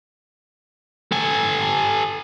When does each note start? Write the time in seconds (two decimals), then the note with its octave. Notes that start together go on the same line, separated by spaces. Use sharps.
1.12 A4 G#5